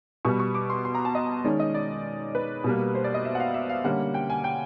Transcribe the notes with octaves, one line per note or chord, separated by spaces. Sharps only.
B2 G3 B3 C#6
C#6
D6
C6
C6
A#5
A5
D#5
D#3 G#3 C#4 D5
D#5
D5
B4
B2 G3 A#3
C5
D5
D#5
E5
F#5
F5
E5
F5
D3 G3 A#3 C#4 F#5
G5
G#5
G5